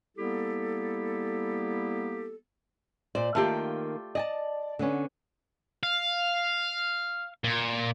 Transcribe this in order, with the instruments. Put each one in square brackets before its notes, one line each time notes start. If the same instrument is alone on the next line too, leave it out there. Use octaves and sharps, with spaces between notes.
[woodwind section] G3 A#3 B3 E4 G4 A4
[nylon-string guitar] A#2 C5 [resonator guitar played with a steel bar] D5
[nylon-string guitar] D#3 A#3 D#4 [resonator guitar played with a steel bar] A3 F4 G4
[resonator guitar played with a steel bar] D5 [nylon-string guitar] D#5 G#5 A5
[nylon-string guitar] D3 B3 C#4
[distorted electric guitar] F5
A#2